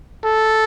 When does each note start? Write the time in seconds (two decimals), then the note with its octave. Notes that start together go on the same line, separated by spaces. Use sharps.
0.24 A4